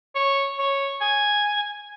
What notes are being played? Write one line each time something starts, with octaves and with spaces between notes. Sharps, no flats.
C#5
C#5
G#5